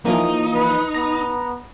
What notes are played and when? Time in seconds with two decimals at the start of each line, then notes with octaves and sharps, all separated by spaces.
0.05 E3 F3 A#3 D#4
0.54 B4
0.94 B3 A#5